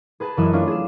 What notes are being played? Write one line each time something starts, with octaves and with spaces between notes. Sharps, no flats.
G#4 B4 G#5 A5
F#2 E3 E4 D#5 E5 E6
A3 C#4 D4 F4
G#4 E7